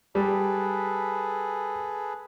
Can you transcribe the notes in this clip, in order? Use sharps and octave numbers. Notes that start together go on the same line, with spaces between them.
G3 G#4 A4 B4